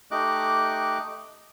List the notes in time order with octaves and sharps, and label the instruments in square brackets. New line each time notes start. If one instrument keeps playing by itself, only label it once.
[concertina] A3 D#4 G4 D#5 D6 F#6